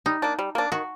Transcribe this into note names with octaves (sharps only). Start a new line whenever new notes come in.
G3 D#4
A#3 D4
G3
A#3 D4
D#3 F#4